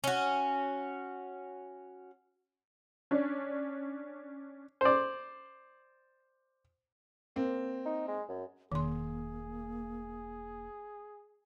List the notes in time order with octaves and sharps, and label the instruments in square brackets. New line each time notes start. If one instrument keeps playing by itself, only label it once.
[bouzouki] C#4 F#4
[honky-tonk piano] C#4 D4
[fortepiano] C5 D5
[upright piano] A#3 C4
[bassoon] D#4
G#3
F#2
[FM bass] E1 [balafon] D#3 C6 [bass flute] A#3 [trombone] G#4